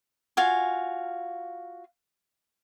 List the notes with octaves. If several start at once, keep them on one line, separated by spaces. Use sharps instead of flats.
F4 F#4 F5 G#5